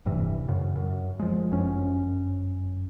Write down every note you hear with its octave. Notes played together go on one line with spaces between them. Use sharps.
D1 G2 C3 E3
F#2 C#3
F#2
F3 G#3
G1 F#2 C#4